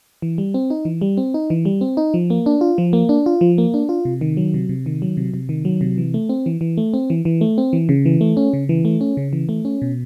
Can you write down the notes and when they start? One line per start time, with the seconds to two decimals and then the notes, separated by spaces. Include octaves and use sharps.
0.22 E3
0.38 G3
0.54 C4
0.70 D#4
0.85 E3
1.01 G3
1.17 C4
1.34 D#4
1.50 E3
1.65 G3
1.81 C4
1.97 D#4
2.14 F3
2.30 A#3
2.46 D4
2.61 F4
2.78 F3
2.93 A#3
3.09 D4
3.26 F4
3.41 F3
3.58 A#3
3.74 D4
3.89 F4
4.05 C3
4.21 D#3
4.37 F#3
4.54 C3
4.69 C3
4.86 D#3
5.02 F#3
5.17 C3
5.34 C3
5.49 D#3
5.65 F#3
5.81 C3
5.98 E3
6.14 A3
6.29 C4
6.46 E3
6.61 E3
6.77 A3
6.94 C4
7.10 E3
7.25 E3
7.41 A3
7.58 C4
7.73 E3
7.89 C#3
8.05 E3
8.21 A3
8.37 C#4
8.53 C#3
8.69 E3
8.85 A3
9.01 C#4
9.17 C#3
9.33 E3
9.49 A3
9.65 C#4
9.82 B2